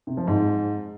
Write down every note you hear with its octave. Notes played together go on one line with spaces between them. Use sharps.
C3
F3
G#2